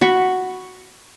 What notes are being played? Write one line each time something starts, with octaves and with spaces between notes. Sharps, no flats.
F#4 B5 C#6